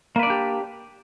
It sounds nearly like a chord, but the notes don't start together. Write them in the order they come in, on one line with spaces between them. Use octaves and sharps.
A#3 B4 D5 D4 G4